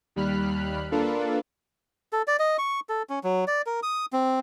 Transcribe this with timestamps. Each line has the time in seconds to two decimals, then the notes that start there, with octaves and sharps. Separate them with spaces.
0.16 D#2 G3 B5 F6 F#6
0.91 A#3 D4 F4 A4 B4
2.13 A4
2.27 D5
2.39 D#5
2.58 C#6
2.89 A4
3.09 C#4
3.24 F#3
3.47 D5
3.66 A#4
3.83 D#6
4.13 C4